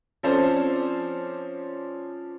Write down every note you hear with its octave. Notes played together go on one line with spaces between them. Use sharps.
F3 C4 C#4 A4 C5 D5